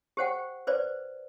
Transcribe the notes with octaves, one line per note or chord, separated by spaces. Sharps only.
G4 C5 F#5 G5
B4 C5 D5